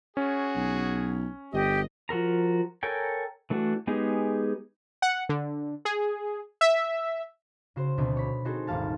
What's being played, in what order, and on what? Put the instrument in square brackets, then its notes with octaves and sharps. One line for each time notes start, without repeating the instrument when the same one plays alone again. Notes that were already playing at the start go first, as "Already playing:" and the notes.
[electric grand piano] C#4 [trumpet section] F#4 G#4
[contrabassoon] B1
[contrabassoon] G1 [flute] G4 [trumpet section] D#5
[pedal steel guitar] F3 F#4 A#4 A#5
A4 A#4 C#5 G5 G#5
E3 A3 D4 F#4
G#3 B3 D#4 G4 G#4
[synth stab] F#5
D3
G#4
E5
[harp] C#3 F#4 C5
D2 B2 B3 C4
C#5 B5
C4 D#4 F#4 G#4 A4 C5
D#1 G#1 G3 F5 A5